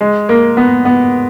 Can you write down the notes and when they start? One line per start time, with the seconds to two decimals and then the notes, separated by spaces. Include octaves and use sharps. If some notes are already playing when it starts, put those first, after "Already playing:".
0.01 G#3
0.29 A#3
0.57 B3
0.85 B3